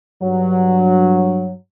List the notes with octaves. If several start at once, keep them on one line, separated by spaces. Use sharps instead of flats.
G2 F#3